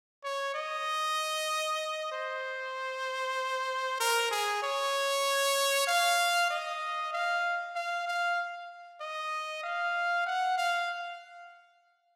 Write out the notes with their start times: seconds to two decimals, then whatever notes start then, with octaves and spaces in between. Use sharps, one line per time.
0.24 C#5
0.54 D#5
2.12 C5
4.00 A#4
4.31 G#4
4.63 C#5
5.87 F5
6.50 D#5
7.13 F5
7.75 F5
8.07 F5
9.01 D#5
9.63 F5
10.26 F#5
10.58 F5